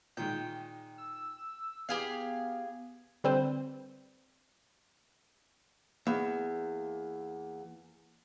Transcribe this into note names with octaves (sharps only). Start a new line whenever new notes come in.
A#2 D#3 G#3 G5
E6
E2 B3 G4 G#4 F5
D3 G3 C4 B4 C5
E2 A#3